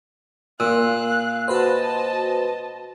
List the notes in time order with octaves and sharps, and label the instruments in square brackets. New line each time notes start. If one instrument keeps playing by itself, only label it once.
[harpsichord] A#2 [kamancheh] F5 F#6 [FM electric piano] E6
[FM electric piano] F#4 B4 C5 [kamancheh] D#5 A5